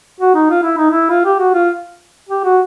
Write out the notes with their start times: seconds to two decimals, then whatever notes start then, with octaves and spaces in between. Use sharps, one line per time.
0.20 F#4
0.35 D#4
0.51 F4
0.63 E4
0.78 D#4
0.91 E4
1.10 F4
1.25 G4
1.39 F#4
1.54 F4
2.29 G4
2.44 F#4